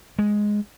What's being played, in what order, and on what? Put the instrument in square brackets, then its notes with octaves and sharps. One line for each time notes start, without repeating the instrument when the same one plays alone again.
[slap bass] G#3